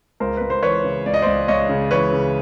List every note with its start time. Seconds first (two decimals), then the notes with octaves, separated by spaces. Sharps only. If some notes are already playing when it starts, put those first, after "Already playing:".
0.20 C#2 A#4 C5
0.37 C#2 B4
0.50 C5
0.63 E3 B4 C#5
0.84 C#3
1.06 C#2 D5
1.14 D#5
1.22 C#2 C5 D5
1.48 C#2 C#5 D#5
1.69 C#3
1.91 E3 B4 C#5
2.13 C#3